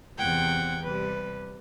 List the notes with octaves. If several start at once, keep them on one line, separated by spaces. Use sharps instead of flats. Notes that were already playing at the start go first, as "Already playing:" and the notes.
E2 C3 C4 F#5 G5 G#6
C3 G3 B4